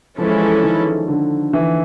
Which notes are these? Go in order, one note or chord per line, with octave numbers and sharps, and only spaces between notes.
E3 F3 G#3 C#4 E4 A4
D#3
D3
E3